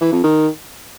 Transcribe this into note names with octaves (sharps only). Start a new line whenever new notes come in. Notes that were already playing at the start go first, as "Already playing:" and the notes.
E3
F2
D#3